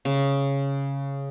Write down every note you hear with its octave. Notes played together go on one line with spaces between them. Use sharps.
C#3